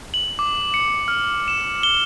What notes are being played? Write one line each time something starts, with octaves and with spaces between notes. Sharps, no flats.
F#7
D6
C#7
F6
E7
G7